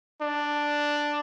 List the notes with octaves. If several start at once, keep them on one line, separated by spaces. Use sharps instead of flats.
D4